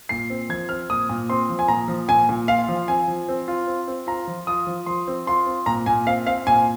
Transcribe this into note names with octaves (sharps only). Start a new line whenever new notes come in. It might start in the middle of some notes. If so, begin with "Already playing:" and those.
A#2 C7
C4
F3 G#6
C4 F6
A#2 D#6
A#2
C4 C6
F3
G#5
A#2 A#5
F3
A#2 G#5
A#2
F4 F5
F3
C4 G#5
F3
C4
F4
C4
C4
F4 A#5
F3
F4 D#6
F3
F3 C6
C4
F4 C6
C4
A#2 A#5
A#2 G#5
C4 F5
C4 F5
A#2 G#5